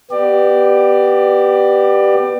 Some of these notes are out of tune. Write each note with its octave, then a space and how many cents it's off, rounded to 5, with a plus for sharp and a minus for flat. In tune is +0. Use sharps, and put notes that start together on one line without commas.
B3 +0 G4 -10 D5 +20